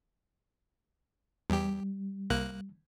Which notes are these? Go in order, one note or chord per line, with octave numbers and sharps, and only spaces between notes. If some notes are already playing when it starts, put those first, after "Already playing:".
E2 G3 G4
C2 A#3 F#6